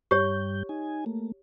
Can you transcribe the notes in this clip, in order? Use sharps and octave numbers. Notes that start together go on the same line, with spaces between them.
G2 G3 G4 C#5 G6
D#4 G#5
A3 A#3